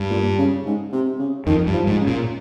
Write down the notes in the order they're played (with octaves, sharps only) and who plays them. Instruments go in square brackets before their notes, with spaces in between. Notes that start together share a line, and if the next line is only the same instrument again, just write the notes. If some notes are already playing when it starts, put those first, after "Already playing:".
Already playing: [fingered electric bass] G2
[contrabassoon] A#2
C#3
G#2
C3
C#3
[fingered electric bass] F2 [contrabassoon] D#3
[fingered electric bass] G2
[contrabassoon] F3
[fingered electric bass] G#2
[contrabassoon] C#3
[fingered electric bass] A#2